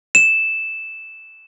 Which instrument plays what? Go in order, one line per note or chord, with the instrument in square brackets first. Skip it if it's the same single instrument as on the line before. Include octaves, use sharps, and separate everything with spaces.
[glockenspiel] E7